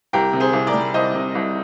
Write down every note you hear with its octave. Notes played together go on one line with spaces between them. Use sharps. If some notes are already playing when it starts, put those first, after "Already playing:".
C2 G4 A#4
C3
G#4 C5
C2
A#4 D5
G3
C2 C5 D#5
C3
C2